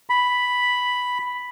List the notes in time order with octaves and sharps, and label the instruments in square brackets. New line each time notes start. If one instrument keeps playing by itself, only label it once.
[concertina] B5